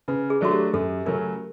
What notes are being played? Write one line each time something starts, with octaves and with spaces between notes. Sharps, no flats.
C#3 B4
G#4
F#3 A3 D4 F#4
G4
F#2 A4
C#3 F#3 A3 C#4 A#4